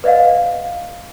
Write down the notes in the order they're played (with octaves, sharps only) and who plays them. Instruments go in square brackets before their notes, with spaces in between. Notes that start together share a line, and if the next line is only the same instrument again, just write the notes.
[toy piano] B4 D5 D#5 F5 F#5